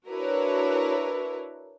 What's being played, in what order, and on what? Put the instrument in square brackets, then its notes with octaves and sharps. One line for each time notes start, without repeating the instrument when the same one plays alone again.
[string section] D4 E4 F#4 A#4 B4 C#5